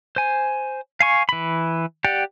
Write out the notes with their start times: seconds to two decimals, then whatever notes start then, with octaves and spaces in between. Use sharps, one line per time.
0.16 C5 G#5
1.00 F5 G#5 C#6
1.29 E3 B5
2.04 G4 D5 F#5 G5